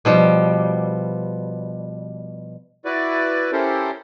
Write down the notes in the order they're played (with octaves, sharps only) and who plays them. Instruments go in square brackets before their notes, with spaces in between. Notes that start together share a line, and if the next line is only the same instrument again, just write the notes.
[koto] B2 F3 G3
[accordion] E4 F#4 B4 D5
C#4 E4 G4 A4 A#4 C5